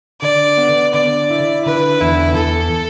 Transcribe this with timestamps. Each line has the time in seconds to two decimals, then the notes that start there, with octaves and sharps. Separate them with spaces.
0.21 D3 D5
0.57 B3
0.94 D3 D5
1.30 E4
1.66 D3 B4
2.01 E2 E4
2.37 E2 A4